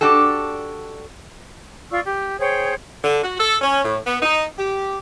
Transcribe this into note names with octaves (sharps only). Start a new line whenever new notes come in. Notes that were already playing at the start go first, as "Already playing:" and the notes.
D4 F#4 G4 A4
F4 D5 C#6 E6
G4
G#4 C5 C#5 G5
D3
F#4
A4
C#4
A2
B3
D#4
G4